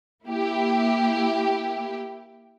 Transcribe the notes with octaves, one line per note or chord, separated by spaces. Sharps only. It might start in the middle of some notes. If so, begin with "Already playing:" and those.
A#3 E4 G4